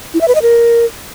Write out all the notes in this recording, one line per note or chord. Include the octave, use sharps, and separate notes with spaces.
E4
E5
B4
D#5
A#4